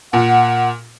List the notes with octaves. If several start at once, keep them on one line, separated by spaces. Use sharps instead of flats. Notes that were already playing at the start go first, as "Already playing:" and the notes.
A#2 F#5